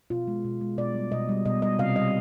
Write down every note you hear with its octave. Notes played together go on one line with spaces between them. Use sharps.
B2 F4
G#3
B2
G#3
B2 D5
G3
B2 D#5
G3
B2 D#5
G3 D#5
C3 F5
G3 D#5